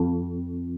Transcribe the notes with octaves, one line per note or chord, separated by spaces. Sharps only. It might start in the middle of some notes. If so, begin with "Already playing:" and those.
Already playing: F2